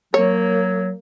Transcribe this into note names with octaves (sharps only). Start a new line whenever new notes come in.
F#3 A#3 C#5